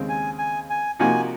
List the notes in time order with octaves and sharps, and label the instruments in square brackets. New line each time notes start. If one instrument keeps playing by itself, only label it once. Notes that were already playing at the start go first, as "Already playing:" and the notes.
Already playing: [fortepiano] D#2 C#3 G#3 C4
[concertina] G#5
G#5
G#5
[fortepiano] C3 F3 A#3 D#4 F#4 [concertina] G#5